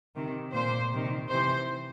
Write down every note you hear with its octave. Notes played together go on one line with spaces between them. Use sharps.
C3 D#3
A#2 C5
C3 D#3
C3 E3 C5